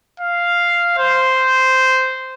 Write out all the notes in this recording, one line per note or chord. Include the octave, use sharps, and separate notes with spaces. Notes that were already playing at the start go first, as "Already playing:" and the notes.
F5
C5